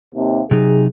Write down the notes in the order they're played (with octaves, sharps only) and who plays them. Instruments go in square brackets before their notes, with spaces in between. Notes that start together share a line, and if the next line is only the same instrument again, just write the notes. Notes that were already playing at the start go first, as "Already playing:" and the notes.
[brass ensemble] D#2 C3
[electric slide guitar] C3 F#3 D#4 [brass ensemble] G#4